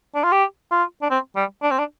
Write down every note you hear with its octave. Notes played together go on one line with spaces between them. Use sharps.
D4
F4
G4
F4
D4
C4
G3
D4
C4
D4